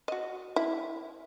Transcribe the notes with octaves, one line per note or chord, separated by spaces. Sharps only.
F#4 D#5
E4